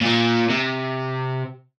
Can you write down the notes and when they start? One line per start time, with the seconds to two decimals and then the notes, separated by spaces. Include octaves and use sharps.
0.01 A#2 A#3
0.50 C3